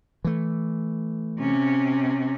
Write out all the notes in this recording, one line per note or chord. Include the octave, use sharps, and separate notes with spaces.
E3 A3
C3 C#4